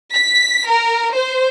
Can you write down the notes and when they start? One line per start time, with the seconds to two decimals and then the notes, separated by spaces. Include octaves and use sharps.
0.13 B6
0.68 A#4
1.13 C5